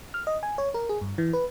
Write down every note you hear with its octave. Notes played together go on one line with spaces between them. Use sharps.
F6
D#5
G#5
C#5
A#4
G#4
G2
E3
B4